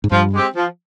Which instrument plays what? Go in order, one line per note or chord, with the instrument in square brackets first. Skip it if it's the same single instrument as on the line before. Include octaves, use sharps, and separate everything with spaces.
[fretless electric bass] G#2
[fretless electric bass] G2 [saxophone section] F3
[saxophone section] G#3 C4 G4
F3